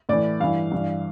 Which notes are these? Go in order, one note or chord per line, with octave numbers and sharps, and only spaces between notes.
A2 E3 D5
G2 E3 F5
G2 E3